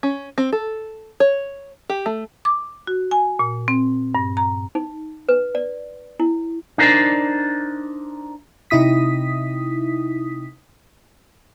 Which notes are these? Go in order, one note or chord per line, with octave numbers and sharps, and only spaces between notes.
C#4
C4
A4
C#5
G4
A3
D6
F#4
G#5
A#2
C4
G2
A#5
D#4
B4
D5
E4
D4 D#4 A#4 C5 D5
C3 D#4 E4 D#6 B6